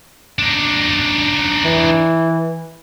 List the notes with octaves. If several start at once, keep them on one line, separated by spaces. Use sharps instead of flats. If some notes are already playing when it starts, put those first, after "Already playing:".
D4 D#4
E3